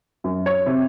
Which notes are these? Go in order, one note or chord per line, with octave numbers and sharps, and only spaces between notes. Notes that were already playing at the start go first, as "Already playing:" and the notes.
F#2
C#5
C3